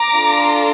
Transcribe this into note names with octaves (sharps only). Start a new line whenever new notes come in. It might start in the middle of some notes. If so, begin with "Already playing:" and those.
Already playing: A#5 D6
D4 F4 A4